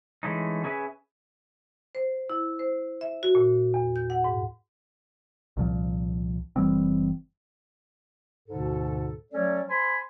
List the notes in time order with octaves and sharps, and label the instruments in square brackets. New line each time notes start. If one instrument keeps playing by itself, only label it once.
[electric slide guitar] E3 G#3 A3 C#4 D#4
C#4 G#4 B4 E5 G#5
[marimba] C5
E4
C5
E5
F#4
A#2
E2
G6
F#5
G#2
[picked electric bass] C2 A#2 F3
F#1 E3 G3 C4
[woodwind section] D2 G#2 B2 D3 A4
F#3 A3 C#4 A4 C#5 D5
C5 G#5 B5 C6